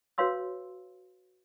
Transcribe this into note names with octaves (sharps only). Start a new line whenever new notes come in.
F#4 B4 C#5 F5 C6 E6